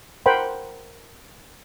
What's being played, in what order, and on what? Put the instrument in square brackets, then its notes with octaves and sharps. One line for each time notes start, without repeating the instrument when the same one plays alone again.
[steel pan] A#4 C5 F#5 G5 B5